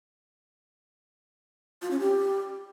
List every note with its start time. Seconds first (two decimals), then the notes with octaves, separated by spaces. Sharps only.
1.82 F4
1.91 C#4
1.99 G4